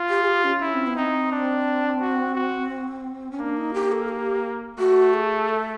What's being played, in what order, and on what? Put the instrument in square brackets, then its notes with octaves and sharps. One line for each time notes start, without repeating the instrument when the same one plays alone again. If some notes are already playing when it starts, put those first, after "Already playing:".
Already playing: [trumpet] F4
[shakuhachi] G4
G#4
G4
C#4
[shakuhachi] C#4 [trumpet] E4
[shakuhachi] C4
B3
[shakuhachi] C4 [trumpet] D#4
[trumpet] D4
F#4
F#4
[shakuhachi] C#4
[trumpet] A#3 [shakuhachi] D4
[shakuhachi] D#4
G4
A4
G4
[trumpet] A3 [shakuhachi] F#4
[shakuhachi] G#4
A4